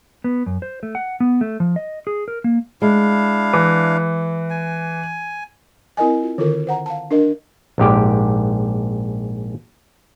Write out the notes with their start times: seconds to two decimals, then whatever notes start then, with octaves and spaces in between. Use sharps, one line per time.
0.24 B3
0.46 F#2
0.62 C5
0.83 A3
0.95 F#5
1.20 B3
1.41 A3
1.60 F3
1.76 D#5
2.07 G#4
2.28 A#4
2.44 A#3
2.82 G#3 D4 E4 F5
3.53 E3
4.50 G#5
5.97 C4 E4 A#4 D#5 G#5
6.23 F4
6.38 D3 D#3 F4 A4 A#4
6.67 C5 F#5 A#5
6.86 F5 A5
7.11 D4 A#4 D#5
7.78 A#1 G#2 G4 D5